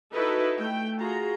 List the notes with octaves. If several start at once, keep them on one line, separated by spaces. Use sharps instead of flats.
D#4 E4 F#4 A4 B4
A3 G5
F4 F#4 G#4 A#5